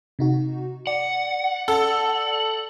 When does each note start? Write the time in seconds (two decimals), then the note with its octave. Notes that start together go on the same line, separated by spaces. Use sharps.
0.19 C3 D#4 F#4
0.87 D5 F#5
1.68 A4